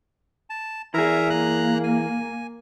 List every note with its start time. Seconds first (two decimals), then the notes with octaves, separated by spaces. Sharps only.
0.50 A5
0.94 E3 G#4 A#4 E5 A#5
1.30 A#3 A#5 F#6
1.84 G#5